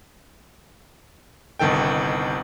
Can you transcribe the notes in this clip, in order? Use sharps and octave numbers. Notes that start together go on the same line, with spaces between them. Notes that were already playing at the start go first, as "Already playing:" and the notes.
G1 C2 D#3 A4 G5